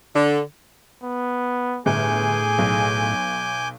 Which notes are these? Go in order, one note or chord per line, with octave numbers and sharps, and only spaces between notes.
D3
B3
G1 A2 G#4 G#5 D6 G6
B1